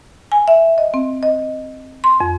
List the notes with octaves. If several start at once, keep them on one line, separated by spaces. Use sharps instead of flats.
G#5
E5
D#5
C4
D#5
C6
F2